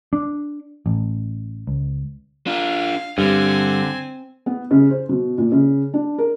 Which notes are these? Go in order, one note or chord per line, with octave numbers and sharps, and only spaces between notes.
D4
A1
C#2
D4 F4 F5
G2 D3 C4 G#5
B3
C#3
C5
B2
A#2
C#3
D4
A#4